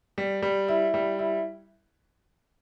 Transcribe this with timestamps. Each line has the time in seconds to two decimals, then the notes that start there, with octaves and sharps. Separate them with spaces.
0.18 G3
0.42 G3
0.68 E4
0.94 G3
1.19 E4